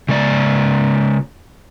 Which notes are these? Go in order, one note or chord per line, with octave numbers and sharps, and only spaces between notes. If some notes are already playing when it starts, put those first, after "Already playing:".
C#3 G#3 D5